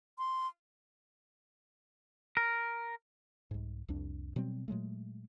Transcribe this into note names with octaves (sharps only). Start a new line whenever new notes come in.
C6
A#4
C2 G#2
C2 F2 D4
B2 F#3 G3 C4
A#2 F#3 G#3 A3